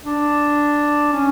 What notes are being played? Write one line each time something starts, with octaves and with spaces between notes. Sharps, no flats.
D4
C#4